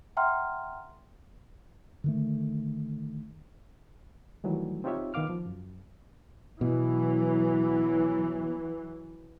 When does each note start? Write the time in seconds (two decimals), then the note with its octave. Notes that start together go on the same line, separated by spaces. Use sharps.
0.17 E5 F#5 G5 A#5 C6 F6
2.04 D3 D#3 A3
4.44 D#3 E3 F#3 G3 A3
4.84 C4 D#4 F4 G4 C#5 E5
5.14 D#3 B3 F5 D6 F6
5.30 F3
5.46 F#2
6.61 B2 E3 F#3